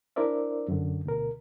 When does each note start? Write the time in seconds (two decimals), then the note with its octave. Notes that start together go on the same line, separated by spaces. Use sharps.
0.16 D4 E4 A#4 C5 D5 E5
0.68 F#2 D3
1.05 D2 B2 A#4